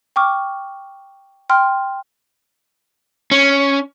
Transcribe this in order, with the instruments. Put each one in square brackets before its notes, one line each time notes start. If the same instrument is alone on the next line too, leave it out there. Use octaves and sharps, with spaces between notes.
[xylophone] G5 C#6 D6 F6
G5 C6 F6
[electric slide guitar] C#4